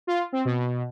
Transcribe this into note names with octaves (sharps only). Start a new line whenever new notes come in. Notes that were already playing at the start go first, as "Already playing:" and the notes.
F4
C4
B2